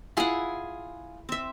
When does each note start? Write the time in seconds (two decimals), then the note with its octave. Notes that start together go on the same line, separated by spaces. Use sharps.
0.17 E4 F4 G#4 F#5 G#5
1.29 C4 E5